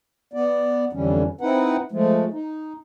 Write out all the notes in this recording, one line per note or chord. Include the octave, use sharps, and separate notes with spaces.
B3 D5
F2 D3 E3 G3 C#4
C4 D#4 E4 B4 F#5
F3 G#3 A3
D#4